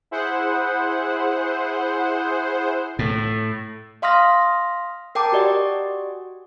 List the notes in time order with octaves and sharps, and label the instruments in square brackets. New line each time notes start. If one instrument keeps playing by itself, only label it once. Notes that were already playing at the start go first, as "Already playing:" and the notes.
[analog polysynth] E4 G#4 C5 F#5
[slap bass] A2
[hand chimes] D#5 F5 C6 D#6 F6 A#6
A#4 G5 A5 D6
F#4 G4 D5 D#5 F#5 G#5